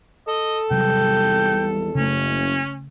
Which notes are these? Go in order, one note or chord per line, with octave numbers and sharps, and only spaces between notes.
A4 D#5
G#1 E2 C3 F#3 G3 G5
F#1 C#3 A3 C#4